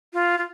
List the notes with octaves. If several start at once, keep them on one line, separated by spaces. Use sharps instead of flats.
F4
F4